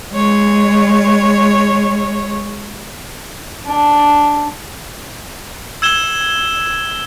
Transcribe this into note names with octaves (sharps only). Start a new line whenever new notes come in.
G#3 C#5
D4
E6 G#6 E7 G7